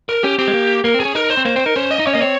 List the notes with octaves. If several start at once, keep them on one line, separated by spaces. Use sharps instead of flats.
A#4
C#4 G4
C4 G4
G#3
A#3
A#3 A#4
C4
G#4
C#4
D#4 A#4
C5
C4
A#3 C5
C4 C5
D#4 A#4
C#4 C5
D#5
D#4
C#4 C#5
A#3 D#5
C4 C#5